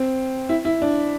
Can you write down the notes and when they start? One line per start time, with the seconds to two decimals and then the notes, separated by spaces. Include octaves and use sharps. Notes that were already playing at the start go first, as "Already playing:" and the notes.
Already playing: C4
0.49 E4
0.65 E4
0.82 D4